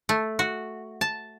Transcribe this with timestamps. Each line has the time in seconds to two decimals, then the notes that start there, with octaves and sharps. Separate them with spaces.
0.09 A3
0.39 F#4
1.01 A5